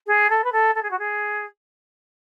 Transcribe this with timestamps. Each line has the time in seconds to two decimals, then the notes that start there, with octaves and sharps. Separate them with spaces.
0.07 G#4
0.30 A4
0.44 B4
0.52 A4
0.75 A4
0.83 G#4
0.91 F#4
0.99 G#4